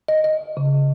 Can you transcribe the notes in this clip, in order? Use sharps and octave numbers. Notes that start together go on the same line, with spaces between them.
D#5
D#5
C#3